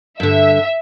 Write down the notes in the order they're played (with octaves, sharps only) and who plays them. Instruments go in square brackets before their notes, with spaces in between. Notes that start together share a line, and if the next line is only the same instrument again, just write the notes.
[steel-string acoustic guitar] G2 D3 [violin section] E5